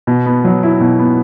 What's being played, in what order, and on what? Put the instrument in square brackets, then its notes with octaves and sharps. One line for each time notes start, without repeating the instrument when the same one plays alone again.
[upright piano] B2
B3
F#3
E4
B2
B3